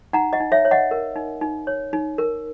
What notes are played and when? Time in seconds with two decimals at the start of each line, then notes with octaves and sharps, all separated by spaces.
0.13 D#4 F#5 A#5
0.33 D#5 F#5
0.40 D#4
0.52 C#5 E5
0.65 C#5
0.71 D#5 F#5
0.91 A#4
1.16 D#4
1.41 D#4
1.67 C#5
1.93 D#4
2.18 A#4